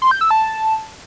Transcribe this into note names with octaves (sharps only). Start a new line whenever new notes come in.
C6
G6
E6
A5